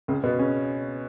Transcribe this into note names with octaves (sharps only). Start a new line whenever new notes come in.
C#2 C#3
B2 B3
C#3 C#4